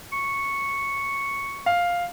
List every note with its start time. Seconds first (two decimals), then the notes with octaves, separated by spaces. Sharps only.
0.12 C#6
1.66 F5